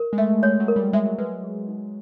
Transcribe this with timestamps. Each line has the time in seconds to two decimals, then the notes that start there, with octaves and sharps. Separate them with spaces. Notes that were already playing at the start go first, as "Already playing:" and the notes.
Already playing: A#4
0.13 G#3
0.18 A3 E5
0.43 G#3 C#5
0.60 F#3
0.68 A#4
0.76 G3
0.93 G#3 E5
1.05 F#3
1.18 G#3 B4
1.32 G#3
1.44 G#4
1.68 D#4